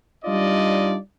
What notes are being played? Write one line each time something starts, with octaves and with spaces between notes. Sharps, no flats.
G3 D4 D#4 F4 D5 D#5